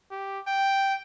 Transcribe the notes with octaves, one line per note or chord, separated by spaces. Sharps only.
G4
G5